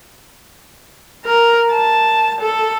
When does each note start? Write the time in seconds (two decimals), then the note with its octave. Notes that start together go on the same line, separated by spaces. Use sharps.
1.25 A#4
1.73 A5
2.41 A4